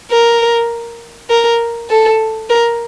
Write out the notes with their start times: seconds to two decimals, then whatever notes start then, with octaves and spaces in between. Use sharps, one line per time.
0.11 A#4
1.30 A#4
1.90 A4
2.50 A#4